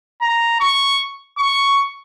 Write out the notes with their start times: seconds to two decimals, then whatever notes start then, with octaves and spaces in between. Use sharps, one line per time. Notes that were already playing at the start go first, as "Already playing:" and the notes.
0.22 A#5
0.61 C#6
1.38 C#6